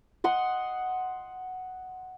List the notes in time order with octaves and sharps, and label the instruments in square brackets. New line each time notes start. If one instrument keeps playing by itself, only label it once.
[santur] D#5 F#5 C6